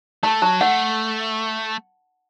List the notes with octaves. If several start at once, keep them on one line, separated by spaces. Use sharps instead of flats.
A3 A5
F#3 A5
A3 F#5